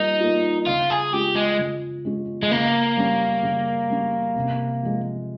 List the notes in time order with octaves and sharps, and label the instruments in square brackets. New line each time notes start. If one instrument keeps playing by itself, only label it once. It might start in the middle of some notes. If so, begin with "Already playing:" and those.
Already playing: [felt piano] G3 A#3 F4 [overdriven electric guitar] D#4
[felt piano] A#3 F4
[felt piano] C#3 [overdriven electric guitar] F4
[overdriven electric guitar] G#4
[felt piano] G#3 C#4 F4 [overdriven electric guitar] G4
[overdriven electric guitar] G#3
[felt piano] C#3
G#3 C#4 F4
[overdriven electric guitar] G#3
[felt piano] C#3 [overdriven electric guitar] A#3
[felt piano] G3 C#4
C#3
G3 C#4
C3
F3 G#3